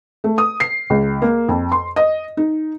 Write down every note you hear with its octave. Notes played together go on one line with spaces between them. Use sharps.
A3
D#6
C7
C#2
A#3
F2
C6
D#5
D#4